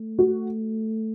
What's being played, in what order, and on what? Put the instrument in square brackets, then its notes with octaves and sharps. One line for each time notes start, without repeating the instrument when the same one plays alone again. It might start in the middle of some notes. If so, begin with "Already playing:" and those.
Already playing: [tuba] A3
[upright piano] F#4